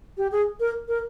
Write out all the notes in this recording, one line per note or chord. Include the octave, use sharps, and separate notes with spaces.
G4
G#4
A#4
A#4